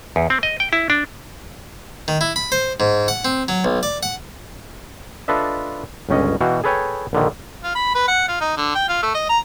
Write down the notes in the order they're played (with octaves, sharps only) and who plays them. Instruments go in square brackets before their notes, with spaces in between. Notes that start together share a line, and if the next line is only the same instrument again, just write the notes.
[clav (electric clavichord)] E2
C4
D#5
G5
E4
D4
[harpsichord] D#3
E4
B5
C5
G#2
F#5
C4
F#3
B1
D5
F#5
[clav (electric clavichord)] D4 F4 A4 B4 D#5 E5
G1 C#2 C#4 D#5
B2 E3 F#4 F5 G5
G#4 A4 B4 C#5 G5 G#5
A#1 D3 D#3
[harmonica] F4
B5
B4
F#5
F4
D#4
D3
G5
F4
A3
D#5
A#5